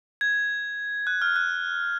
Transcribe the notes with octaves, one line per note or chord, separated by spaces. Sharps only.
G#6
F#6
F6
F#6